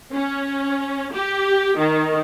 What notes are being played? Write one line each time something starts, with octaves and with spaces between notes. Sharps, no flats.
C#4
G4
D#3